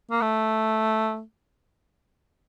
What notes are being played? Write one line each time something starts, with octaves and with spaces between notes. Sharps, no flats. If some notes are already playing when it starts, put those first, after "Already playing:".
A#3
A3